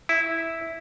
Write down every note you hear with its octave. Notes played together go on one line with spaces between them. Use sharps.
E4